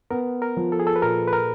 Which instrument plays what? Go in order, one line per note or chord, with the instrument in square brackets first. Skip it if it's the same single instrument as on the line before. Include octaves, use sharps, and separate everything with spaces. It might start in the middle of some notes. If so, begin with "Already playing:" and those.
[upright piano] B3 [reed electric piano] A#4
[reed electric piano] A#4
[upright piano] F3
[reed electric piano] A4
G#4
A4
B4
[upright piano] A#2 [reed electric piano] A#4
[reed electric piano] B4
A#4